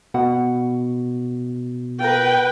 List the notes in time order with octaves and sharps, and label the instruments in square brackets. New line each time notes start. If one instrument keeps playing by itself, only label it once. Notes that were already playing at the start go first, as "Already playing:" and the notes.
[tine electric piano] B2 [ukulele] F#5
[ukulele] F4 A#4 [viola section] B4 G5